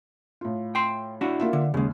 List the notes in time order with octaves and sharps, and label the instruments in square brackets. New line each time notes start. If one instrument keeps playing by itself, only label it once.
[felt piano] A2 F4
[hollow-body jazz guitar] G5 C6
D4 E4 F#4
[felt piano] A#3 F4 E5
[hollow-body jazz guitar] D3
[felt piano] D#2 [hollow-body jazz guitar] C#3 G#3